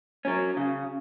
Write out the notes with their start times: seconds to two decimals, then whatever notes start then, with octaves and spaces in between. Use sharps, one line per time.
0.25 F#3 C#4
0.57 C#3